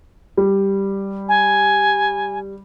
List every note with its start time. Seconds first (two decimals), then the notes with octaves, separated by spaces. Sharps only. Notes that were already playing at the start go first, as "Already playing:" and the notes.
0.37 G3
1.29 G#5